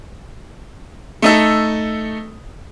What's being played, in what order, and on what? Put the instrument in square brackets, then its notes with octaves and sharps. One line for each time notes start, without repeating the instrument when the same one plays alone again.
[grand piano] A3 D#4 A4